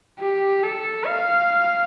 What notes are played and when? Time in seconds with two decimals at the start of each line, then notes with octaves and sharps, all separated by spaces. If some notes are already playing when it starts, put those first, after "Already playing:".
0.19 G4
0.63 A4
1.06 F5